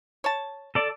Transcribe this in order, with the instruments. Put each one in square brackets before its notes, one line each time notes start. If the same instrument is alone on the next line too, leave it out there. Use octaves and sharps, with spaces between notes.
[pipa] C#5 A5
[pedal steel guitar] A4 D5